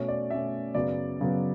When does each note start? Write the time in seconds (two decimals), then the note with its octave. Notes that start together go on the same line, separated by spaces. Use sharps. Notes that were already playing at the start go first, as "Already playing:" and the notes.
Already playing: B2 A3 C#4 C#5
0.08 D5
0.30 B2 A3 C#4 E5
0.75 F#2 C#3 F#3 B3 D5
1.20 F#2 C#3 F#3 B3